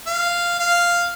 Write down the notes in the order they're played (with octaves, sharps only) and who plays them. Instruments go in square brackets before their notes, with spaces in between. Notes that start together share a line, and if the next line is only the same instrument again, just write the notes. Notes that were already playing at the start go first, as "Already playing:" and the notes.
[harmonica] F5
F5